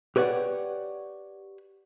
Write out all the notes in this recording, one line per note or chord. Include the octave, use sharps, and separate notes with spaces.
G4 B4 C#5 D5 F#5 G5